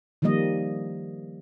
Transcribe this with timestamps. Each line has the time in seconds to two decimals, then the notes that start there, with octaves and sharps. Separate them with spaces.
0.22 D#3 F3 G3 A#3 D#5